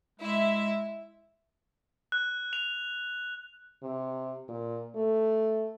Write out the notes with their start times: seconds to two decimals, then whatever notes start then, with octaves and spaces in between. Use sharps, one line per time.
0.20 G#3 E4 E5
2.12 F#6
2.53 F7
3.83 C3
4.49 A#2
4.96 A3